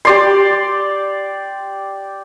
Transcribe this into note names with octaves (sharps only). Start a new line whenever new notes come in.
G4 D5 C6